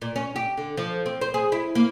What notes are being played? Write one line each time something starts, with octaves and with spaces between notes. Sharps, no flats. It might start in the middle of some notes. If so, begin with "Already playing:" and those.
A#2
C#4
G4
D3
F3
C4
C5
G#4
E4
A#3